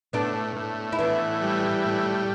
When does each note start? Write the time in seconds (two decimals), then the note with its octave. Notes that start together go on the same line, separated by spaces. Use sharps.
0.13 A2 B3 D4
0.56 A2
0.92 E4
0.99 E3 B3 D4
1.42 G3
1.86 A2